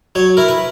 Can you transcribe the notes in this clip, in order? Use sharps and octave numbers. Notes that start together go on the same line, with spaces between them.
F#3 C#5
E4 A#4
B4